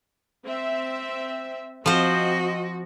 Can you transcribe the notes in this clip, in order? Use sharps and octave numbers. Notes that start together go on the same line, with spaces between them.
C4 E5
F3 C4 F#4 C5 D#5